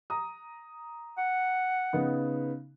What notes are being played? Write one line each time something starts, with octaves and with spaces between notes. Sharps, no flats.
A#5 D#6
F#5
C#3 B3 D#4